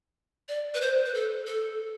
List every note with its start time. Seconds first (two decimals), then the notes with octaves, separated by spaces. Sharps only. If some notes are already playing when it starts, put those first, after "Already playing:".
0.49 D5
0.74 B4
0.81 C5
1.05 B4
1.14 A4
1.47 A4